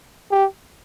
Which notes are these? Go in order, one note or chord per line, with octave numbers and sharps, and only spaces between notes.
G4